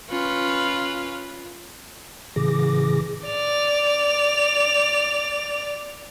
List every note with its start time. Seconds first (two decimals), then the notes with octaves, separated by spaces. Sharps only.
0.10 C#4 F4 B4
2.36 A2 C#3 E3 G#4 D6 A#6
3.27 D5 F7